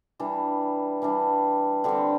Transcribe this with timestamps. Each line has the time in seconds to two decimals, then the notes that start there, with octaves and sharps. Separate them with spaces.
0.19 E3 G3 D4
1.02 E3 G3 D4
1.84 D3 G3 C4 G4